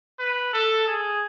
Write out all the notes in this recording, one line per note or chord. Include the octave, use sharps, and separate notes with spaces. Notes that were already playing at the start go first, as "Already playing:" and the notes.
B4
A4
G#4